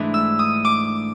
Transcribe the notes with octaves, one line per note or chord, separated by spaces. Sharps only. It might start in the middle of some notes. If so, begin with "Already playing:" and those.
Already playing: G#2 E3 A3 D4
E6
D#6
D6